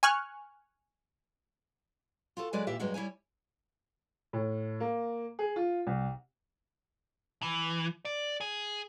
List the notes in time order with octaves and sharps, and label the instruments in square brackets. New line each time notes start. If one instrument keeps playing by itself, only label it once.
[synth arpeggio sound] G#5 C#6 F6 F#6
[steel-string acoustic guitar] F4 F#4 A4
D3 F#3 G#3 G#4 B4 D5
A#2 E3 F4 G4 E5
G2 F#3 G#3 F#4
G3 E4 C#5 G#5
[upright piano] A2
A#3
G#4
F4
C2
[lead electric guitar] E3
D5
G#4